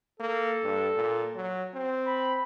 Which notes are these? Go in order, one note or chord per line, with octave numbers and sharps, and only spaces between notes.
A#3 A4
G2
A#2
F#3
C4
B5